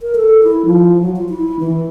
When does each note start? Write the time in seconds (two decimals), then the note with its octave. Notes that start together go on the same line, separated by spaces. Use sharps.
0.01 A#4
0.15 A4
0.43 E4
0.65 F3
1.02 F#3
1.16 F4
1.29 E4
1.60 E3